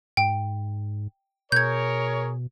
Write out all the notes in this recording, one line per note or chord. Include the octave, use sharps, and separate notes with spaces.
G#2 G5
B2 G#4 A#4 C#5 G6 G#6